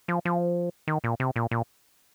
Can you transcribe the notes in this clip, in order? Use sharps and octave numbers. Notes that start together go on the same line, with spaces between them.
F3
F3
D#3
A#2
C3
A#2
A#2